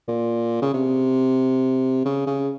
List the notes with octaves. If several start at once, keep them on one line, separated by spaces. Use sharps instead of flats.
A#2
C#3
C3
C#3
C#3